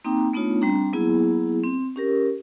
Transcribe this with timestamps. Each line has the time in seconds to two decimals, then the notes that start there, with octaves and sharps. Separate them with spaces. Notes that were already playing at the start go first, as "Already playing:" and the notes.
0.04 A#3 C4 D#4 G5 A#5 D6
0.33 A3 B3 D4 D#4 F4 C#5
0.61 G3 C4 D4 A#5
0.93 F#3 A#3 B3 E4 G#4
1.64 C4
1.96 C#4 G4 A#4